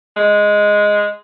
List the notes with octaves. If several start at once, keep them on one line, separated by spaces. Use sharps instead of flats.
G#3